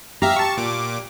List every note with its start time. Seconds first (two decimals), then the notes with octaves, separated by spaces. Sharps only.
0.22 G4 E5 F5 A#5
0.36 A5 C#6
0.57 A#2 D6